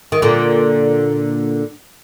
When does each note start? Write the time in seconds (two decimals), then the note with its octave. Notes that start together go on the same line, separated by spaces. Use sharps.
0.12 D#3
0.22 A#2 D3